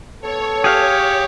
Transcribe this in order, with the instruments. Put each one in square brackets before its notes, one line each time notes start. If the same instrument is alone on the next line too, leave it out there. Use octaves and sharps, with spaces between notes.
[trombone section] B3 A4 [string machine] C#5
[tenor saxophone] G4 [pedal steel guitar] G#4 F5